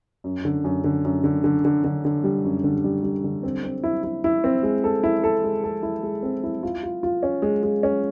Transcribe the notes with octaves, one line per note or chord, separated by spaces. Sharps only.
F#2
D3
F#2
D3
F#2
D3
D3
D3
D3
D3
G3
F#2
D3
G3
G3
D3
C4
C4
E4
E4
E4
C4
G#3
A4
E4
A4
G#3
A4
E4
G#3
C4
E4
F4
F4
F4
C#4
G#3
G#3
C#4